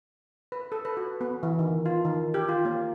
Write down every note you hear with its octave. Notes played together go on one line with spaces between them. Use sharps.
B4
A4
B4
F#4
B3
E3
D#3
F4
D#3
G4
F4
A#3